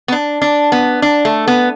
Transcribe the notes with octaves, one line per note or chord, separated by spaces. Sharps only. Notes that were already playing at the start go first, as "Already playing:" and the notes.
B3
D4
D4
B3
D4
A3
B3